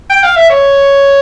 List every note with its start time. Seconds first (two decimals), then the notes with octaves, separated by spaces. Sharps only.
0.10 G5
0.23 F5
0.36 E5
0.50 C#5